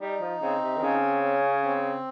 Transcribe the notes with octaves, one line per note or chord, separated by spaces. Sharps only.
G3 D#4
F3
C#3 C4
C3
D#3
C#3 C#4
C#4
C4